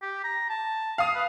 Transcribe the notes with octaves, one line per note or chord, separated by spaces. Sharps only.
G4
A#5
A5
F5 D#6
B4